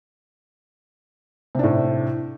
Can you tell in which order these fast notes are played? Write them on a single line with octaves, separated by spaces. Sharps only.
C3 D4 A2